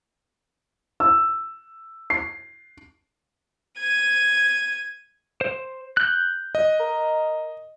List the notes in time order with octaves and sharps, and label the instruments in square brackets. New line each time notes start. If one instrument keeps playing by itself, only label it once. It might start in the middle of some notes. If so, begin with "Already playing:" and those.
[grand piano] E6
C7
[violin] G#6 D#7
[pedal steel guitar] C5
F#6 G6
[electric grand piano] D#5
[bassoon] A#4